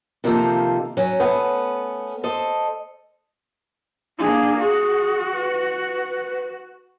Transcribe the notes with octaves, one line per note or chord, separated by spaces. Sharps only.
C3 D#3 F3 A#3 C4 A4
F#3 C#4
A3 B3 C#4
A4 C5 D#5
A#3 D4 G#4
F#4 G#4
B4